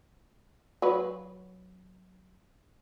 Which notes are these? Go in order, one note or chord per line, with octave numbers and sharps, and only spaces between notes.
F#3 B4